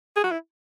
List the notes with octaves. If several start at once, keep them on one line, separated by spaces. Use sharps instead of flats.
G#4
F#4
E4